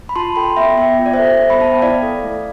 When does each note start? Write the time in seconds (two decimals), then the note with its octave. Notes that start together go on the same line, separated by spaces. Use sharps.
0.09 B5
0.16 F4 A5 C6
0.36 A4 G5 B5
0.56 B3 E5 G5
0.77 B3 E5 G5
0.98 F4 E5
1.06 D5
1.14 C5 E5
1.19 A4
1.40 B3
1.50 B5
1.61 B3 A5
1.72 G5
1.81 E4 D5 F5
2.03 A4
2.24 A3